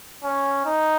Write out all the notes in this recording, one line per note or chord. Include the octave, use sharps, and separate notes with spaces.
C#4
D#4